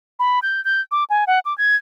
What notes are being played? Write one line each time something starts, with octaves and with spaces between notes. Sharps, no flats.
B5
G6
G6
D6
G#5
F#5
D6
G#6